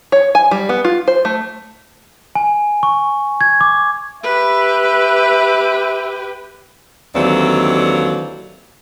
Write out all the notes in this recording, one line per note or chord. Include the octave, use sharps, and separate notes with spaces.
C#5
G#5
G3
B3
F4
C5
A3
G#5
C#6
G#6
D6
G4 B4 E5
D#2 D3 E3 F#3 C4 D5